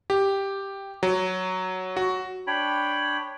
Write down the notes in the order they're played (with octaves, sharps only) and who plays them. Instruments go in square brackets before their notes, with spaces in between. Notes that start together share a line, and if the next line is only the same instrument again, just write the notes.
[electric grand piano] G4
F#3
F#4
[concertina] D4 C#5 G5 B5